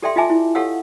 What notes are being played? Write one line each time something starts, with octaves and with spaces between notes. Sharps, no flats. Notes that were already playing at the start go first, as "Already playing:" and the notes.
G4 A4 D5 E5 G5 C6
F4 D#5 E5 G#5 A5 D6
E4
G4 A4 C#5 F5 F#5 E6